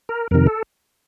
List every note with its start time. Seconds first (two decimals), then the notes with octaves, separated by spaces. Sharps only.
0.09 A#4
0.31 F2 C3 D#3 A#4
0.47 A4